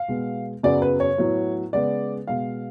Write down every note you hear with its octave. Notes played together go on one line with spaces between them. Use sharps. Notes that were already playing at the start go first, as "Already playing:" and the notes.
Already playing: F5
B2 G#3 B3
F#2 C#3 F#3 B3 D5
B4
C#5
A2 F#3 B3
C#3 G#3 B3 D5
B2 G#3 B3 F5